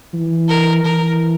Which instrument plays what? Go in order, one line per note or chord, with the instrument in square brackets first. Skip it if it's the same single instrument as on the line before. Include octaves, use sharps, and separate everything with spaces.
[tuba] E3
[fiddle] A#4
[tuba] E3 [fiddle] A#4